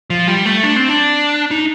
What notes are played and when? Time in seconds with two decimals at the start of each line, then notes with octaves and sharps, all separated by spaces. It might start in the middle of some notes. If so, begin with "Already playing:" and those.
0.10 F3
0.28 G3
0.45 A3
0.64 D4
0.76 C4
0.89 D4
1.51 D#4